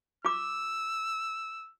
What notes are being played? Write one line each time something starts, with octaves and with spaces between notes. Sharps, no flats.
F4 D6 E6